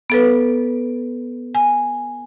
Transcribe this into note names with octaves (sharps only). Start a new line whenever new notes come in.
B3 A4 B4
G#5